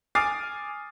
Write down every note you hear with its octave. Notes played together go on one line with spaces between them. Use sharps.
G#5 D6 D#6 F6 A6 C7